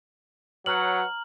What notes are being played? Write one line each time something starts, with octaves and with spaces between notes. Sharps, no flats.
F#3 B4 C#5 F#5 A#5 F6 F#7